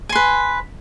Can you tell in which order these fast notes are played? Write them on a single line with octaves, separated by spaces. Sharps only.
G#5 C6 B4